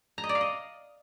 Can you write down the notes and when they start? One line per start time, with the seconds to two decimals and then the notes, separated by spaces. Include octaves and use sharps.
0.18 A#5
0.24 D#5
0.29 D5
0.35 F5
0.41 D#5